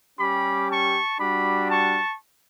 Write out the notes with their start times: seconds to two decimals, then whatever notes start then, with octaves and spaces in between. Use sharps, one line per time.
0.20 G3 C#4 G4 B5 D6
0.69 A5 C#6
1.20 G3 D4 F#4 B5 D6
1.70 A5 C#6